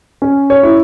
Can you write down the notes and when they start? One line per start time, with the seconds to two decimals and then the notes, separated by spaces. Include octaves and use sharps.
0.22 C#4
0.50 C#5
0.63 E4